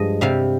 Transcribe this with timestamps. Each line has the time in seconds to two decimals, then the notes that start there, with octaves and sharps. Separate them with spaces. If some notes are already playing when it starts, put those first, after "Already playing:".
Already playing: G2 F3 G#3 D#5
0.21 C3 G3 F5